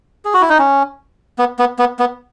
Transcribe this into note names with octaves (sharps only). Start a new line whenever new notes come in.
G#4
F#4
E4
D#4
C#4
B3
B3
B3
B3